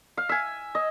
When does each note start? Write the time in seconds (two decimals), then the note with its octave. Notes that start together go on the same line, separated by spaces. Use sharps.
0.17 F5
0.29 E5 G#5
0.75 D#5